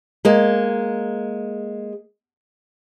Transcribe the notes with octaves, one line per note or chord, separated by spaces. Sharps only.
G#3 A#3